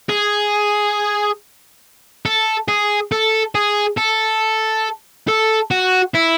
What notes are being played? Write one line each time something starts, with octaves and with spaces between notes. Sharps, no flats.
G#4
A4
G#4
A4
G#4
A4
A4
F#4
E4